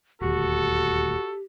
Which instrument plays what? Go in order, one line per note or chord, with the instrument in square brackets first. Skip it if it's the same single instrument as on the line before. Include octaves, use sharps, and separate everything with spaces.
[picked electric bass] D#1 D2 [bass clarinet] F#4 [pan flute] G4 [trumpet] A4